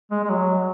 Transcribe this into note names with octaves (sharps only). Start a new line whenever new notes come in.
G#3
G#3
F#3